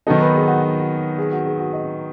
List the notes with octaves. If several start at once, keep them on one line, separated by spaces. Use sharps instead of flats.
D#3 F#3 B3 D#4 A4
B4
G#4
F#4
F#4
F#4
G#4
F#4
G#4
F#4
D#5